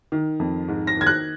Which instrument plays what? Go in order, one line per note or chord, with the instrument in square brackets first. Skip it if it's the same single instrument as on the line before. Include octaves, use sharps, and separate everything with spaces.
[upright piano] D#3
F2
G#2
A#6
D#3 G#6
F#6